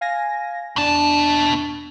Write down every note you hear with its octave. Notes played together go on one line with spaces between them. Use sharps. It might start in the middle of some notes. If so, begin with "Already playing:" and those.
F5 G#5 A#6
E2 B2 D4 A5